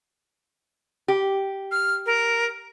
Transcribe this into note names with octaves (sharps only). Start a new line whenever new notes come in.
G4
F6
A#4